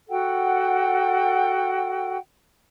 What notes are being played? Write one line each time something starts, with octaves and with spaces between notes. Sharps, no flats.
F#4 A4 F#5 G5